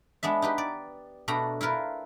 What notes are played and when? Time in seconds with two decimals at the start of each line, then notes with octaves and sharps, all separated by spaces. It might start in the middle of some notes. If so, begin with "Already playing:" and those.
0.23 G#3 B3 D4 E5
0.42 D#4 G4 B4
0.58 D5
1.28 B2 A3 D4 A#5 B5
1.61 E4 F4 A#4 B4